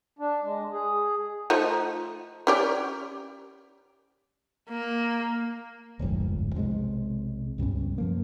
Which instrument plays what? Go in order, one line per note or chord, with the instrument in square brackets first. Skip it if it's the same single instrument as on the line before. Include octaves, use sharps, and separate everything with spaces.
[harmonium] D4
G#3
G#4
[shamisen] F3 A3 D#4
C#4 G4 D5
[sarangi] A#3
[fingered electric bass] D1 G1 F2 G#2
B1 C3 F3 G#3
C#2 G2 B2 C#4
F#2 F3 A#3